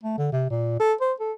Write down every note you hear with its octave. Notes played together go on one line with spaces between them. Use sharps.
A3
D3
C3
A#2
A4
C5
A4